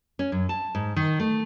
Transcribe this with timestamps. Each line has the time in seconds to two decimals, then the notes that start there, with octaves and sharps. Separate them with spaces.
0.19 C#4
0.32 F#2
0.49 A5
0.75 G#2
0.96 D#3
1.20 A3